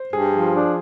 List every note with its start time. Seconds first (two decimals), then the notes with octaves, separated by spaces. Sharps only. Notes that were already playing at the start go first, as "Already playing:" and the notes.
Already playing: C5
0.13 G2 G#4
0.33 F3
0.54 D4